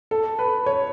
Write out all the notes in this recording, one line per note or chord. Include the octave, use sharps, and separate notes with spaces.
A4
B4
C#5